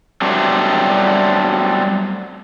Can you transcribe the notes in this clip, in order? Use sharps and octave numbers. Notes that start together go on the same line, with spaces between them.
F#3 G3 A3 B3 C4 D4